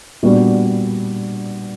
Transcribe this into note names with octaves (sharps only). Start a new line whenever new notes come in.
A#2 G3 B3 D4 F#4